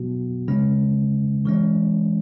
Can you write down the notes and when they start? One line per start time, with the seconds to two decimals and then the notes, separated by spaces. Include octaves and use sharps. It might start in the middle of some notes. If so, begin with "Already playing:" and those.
Already playing: B2 F#3 B3 F#4
0.48 C#3 G#3 C#4
1.45 E3 G#3 C#4